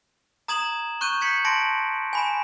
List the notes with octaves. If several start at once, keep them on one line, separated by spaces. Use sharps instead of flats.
A#5 D#6 G#6 E7 F#7
C#6 F#6 G6 D#7
G6 G#6 B6 C#7 F#7
A5 C6 A#6 D7
G#5 B5 E7